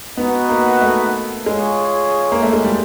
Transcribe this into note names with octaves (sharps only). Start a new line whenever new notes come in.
B3 D#4 F#4 B4 D#5 F#5
A#3
A3
G#3 F4 G#4 C#5
A#3
A3
G#3
G3